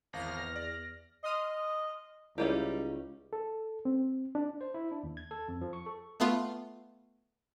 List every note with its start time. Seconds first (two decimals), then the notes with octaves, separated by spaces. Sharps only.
0.13 G#1 E2 F5 F6 A#6
0.56 D5
1.23 D#5 C6 D#6 F6
2.38 C#2 G3 C#4 D#4 E4 G4 F5
3.33 A4
3.85 C4
4.35 D4
4.61 C5
4.74 E4
4.91 D4
5.03 D#2
5.17 G#6
5.31 A4
5.48 F2
5.61 F3
5.73 C#6
5.86 A4
6.20 A3 B3 F4